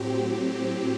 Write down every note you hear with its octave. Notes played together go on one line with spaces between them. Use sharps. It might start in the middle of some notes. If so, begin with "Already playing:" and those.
Already playing: A2 F#3 C4 G4